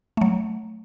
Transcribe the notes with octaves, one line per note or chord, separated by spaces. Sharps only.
F#3 A3